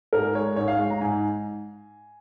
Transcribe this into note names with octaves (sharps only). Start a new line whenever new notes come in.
G#2 A#4
G#3 C#5
G#2 C#5
F5
G#3
A#5
G#2 G#5